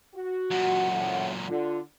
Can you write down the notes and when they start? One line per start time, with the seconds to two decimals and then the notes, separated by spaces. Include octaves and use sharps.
0.15 F#4
0.51 F#2 A#2 F#5
0.91 A2
1.48 D3 F4